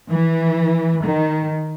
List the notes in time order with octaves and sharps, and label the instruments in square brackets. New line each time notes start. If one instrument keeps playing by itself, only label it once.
[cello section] E3
D#3